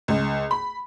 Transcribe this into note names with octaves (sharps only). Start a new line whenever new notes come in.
C#2
B5